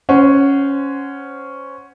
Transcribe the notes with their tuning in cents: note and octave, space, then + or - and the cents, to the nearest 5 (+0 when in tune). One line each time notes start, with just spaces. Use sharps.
C#4 +0 C5 -15 F#5 +0